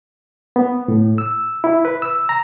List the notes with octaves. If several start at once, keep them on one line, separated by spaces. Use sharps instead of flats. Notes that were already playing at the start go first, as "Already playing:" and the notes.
B3
A2
E6
E4
B4
E6
A#5